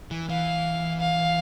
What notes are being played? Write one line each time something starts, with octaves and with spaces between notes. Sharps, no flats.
E3
E3 F5
F5